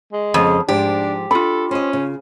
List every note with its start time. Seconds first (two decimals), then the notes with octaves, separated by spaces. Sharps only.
0.13 G#3
0.34 F2 C#3 B3
0.69 G#2 F3 D4 G4
1.31 D4 F4 A4 B5
1.71 C#4 C5 D#5
1.93 C#3